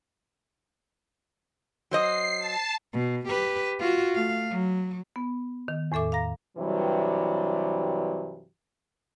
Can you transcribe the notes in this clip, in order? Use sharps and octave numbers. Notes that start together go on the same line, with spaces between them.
F#3 C5 D#5 C7
A5
B2
G4 B4
F4 F#4
A3 F5
F#3
B3
D#3
E2 A2 A4 E5 D6
F5 A#5 A#6
G2 C3 E3 F#3 G3